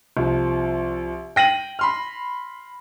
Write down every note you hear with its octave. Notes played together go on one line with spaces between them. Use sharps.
C2 F3
G5 A#6 D#7 F#7
B5 C6 F6